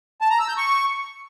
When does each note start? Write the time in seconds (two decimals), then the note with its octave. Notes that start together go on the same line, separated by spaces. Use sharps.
0.21 A5
0.30 A#5
0.39 E6
0.48 G6
0.57 C#6